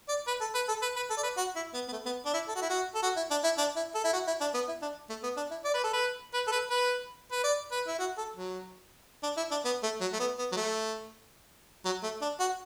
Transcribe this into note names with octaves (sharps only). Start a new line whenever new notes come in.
D5
B4
A4
B4
A4
B4
B4
A4
D5
B4
F#4
E4
B3
B3
A3
B3
D4
E4
A4
F#4
E4
F#4
A4
F#4
E4
D4
E4
D4
E4
A4
E4
F#4
E4
D4
B3
E4
D4
A3
B3
D4
E4
D5
B4
A4
B4
B4
A4
B4
B4
B4
D5
B4
E4
F#4
A4
F#3
D4
E4
D4
B3
A3
F#3
A3
B3
B3
F#3
A3
F#3
A3
D4
F#4